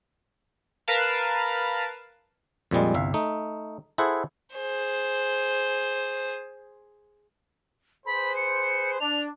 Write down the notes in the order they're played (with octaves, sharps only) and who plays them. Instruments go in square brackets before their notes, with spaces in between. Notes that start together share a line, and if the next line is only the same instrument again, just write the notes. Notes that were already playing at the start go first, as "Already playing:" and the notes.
[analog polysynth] A#4 B4 F5 A5
[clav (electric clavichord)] F2 A#2 G3 G#3
G1 C2 E5 F5
A3 D#4
E4 G#4 A4 C5 E5 F#5
[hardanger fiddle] G#4 C5
[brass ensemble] G#4 B4 C5 [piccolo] B5
[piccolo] C#7
[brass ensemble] D4 [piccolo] F7